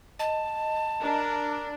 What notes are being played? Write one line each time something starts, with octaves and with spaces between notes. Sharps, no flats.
D#5 A5
D4 A#4